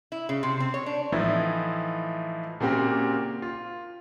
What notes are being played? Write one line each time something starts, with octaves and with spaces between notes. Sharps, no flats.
E4
C#3
C3
C4
C#5
D4
A2 E3 F3 D#4 E4
A#2 C#3 A#3 C4 F#4 G4
F4